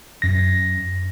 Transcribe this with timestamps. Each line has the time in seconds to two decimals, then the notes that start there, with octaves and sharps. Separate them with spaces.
0.22 F#2 A#6